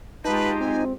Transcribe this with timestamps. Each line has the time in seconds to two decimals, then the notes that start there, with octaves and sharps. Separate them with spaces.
0.24 G#3 D#4 F4 G4 B4 A5
0.60 C4 G#5